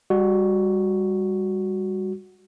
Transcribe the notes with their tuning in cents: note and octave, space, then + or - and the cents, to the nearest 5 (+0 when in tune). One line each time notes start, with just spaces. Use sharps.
G3 +30 F#4 +0